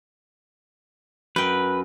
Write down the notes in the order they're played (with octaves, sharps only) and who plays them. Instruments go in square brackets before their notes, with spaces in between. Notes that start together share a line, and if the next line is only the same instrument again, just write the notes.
[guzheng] F#2 G5 [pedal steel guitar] B4